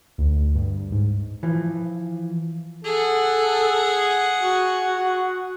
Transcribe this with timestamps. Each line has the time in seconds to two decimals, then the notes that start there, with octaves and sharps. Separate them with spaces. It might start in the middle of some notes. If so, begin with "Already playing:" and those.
0.18 D2
0.55 G2
0.91 G#2
1.43 E3 F3
2.84 G#4 A4 F#5
4.41 F#4